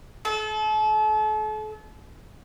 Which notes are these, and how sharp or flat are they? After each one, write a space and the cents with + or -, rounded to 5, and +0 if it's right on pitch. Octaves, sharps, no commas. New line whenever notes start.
A4 -40